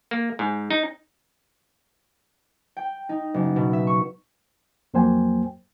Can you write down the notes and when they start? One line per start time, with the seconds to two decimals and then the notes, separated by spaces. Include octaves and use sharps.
0.11 A#3
0.39 G#2
0.70 D#4
2.77 G5
3.09 D#4
3.34 F#1
3.56 B2
3.73 E5
3.87 C#6
4.94 F2 F#3 A#3 C5 G5 G#5